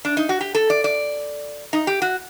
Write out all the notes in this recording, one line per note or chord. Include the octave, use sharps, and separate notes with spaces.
D4
D#4
F#4
G4
A4
D5
D5
D#4
G4
F#4